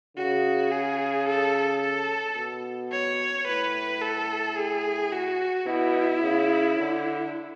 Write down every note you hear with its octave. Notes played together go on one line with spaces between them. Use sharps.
C#3 F#4
G#4
A4
A4
B2
C#5
A2 B4
A4
G#4
F#4
B2 E4
C#3
D3